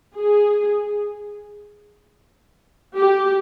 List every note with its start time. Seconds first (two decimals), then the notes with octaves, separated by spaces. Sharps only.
0.16 G#4
2.96 G4